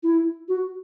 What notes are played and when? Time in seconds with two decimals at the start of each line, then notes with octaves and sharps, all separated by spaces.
0.03 E4
0.48 F#4